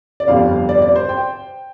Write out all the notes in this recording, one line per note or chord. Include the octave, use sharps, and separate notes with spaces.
D5
G1 F2 C3 G3 F5
D5
D5
C5
G5